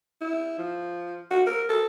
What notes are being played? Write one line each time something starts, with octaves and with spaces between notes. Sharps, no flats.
E4
F3
F#4
A#4
A4